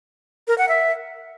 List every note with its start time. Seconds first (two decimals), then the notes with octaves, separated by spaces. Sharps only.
0.48 A#4
0.58 F#5
0.69 E5